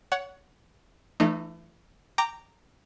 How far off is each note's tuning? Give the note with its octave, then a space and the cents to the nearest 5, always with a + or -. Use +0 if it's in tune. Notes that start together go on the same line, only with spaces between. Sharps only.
C#5 +20 F#5 +0
E3 +30 A3 +0 D#4 -30
G5 +0 A#5 -10 D6 +0